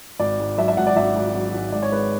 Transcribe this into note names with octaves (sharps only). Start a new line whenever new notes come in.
G#1 D5
G#2
F#3 E5
E5
G#1 F#5
D5
G#1 E5
G#2
F#3
G#1
G#2 D5
C#5
G#3 B4